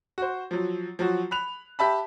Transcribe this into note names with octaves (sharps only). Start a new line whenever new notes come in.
F#4 C5
F3 F#3
F3 F#3 F#4
B5 F#6 F7
G4 E5 A5 B5